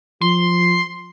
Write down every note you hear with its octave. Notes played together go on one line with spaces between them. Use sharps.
F3 C6